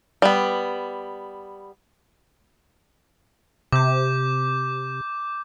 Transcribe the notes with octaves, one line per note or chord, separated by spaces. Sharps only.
G3 B3
C3 D6 G6